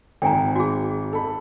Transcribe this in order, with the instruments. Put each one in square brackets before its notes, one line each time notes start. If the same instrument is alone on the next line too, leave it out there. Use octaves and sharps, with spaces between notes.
[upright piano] G#1 [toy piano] G5 G#5 A#5
[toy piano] F#4 G#4
[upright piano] A4 B5